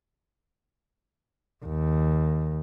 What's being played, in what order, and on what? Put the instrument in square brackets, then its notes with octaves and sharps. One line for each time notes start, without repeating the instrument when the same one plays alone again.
[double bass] D#2